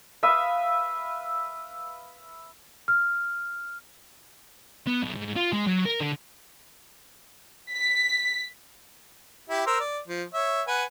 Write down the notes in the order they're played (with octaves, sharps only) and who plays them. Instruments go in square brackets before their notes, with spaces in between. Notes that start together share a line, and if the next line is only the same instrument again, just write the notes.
[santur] B4 E5 F5 D#6
[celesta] F6
[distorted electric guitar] B3
B1
G#2
F4
G#3
F#3
A#4
D3
[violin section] B6
[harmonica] E4 G4
A#4 C5 E6
D5
F3
C#5 E5
B4 F#5 G#5